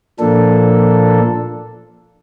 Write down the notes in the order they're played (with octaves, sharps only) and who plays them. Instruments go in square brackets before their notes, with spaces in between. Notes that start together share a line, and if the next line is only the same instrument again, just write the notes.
[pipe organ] A#2 F3 A#3 D4 A4